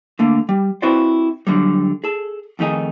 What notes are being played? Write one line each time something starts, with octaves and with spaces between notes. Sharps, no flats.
D3 A3 A#3
G3
C4 E4 F#4 B4 C5 D5
D3 F#3 G3
G#4 A4
F2 D#3 A3 D#4 G#4